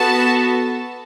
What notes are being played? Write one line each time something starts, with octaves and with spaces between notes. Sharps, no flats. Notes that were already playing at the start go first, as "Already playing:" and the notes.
Already playing: B3 F#4 A4 A5